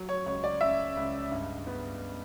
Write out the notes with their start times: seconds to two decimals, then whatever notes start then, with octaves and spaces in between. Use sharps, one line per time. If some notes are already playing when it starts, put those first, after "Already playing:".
Already playing: F#3
0.09 C#5
0.26 C#2 C#5
0.44 D5
0.61 C#4 E5
0.97 C#2
1.31 G2
1.67 B3